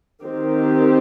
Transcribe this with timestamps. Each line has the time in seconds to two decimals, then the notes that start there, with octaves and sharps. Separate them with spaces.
0.23 D#3 C4 G4